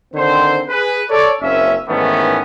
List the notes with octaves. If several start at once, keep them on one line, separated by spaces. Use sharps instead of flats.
D3 D#3 C4 C5
G#4 B4
A4 C#5 D5
F#1 A#3 C4 C#4 E5
G#2 D#3 E3 A3 B3 C#4